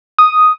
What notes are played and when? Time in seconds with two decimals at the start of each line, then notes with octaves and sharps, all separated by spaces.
0.19 D#6